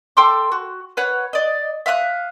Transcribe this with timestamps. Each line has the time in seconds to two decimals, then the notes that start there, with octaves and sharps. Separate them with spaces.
0.17 A4 G5 C6 D6
0.52 F#4
0.97 B4 C#5 F#5
1.33 D5 D#5
1.86 E5 F5 D#6 F#6